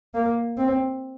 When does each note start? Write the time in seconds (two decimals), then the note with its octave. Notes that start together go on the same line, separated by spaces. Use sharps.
0.14 A#3
0.57 C4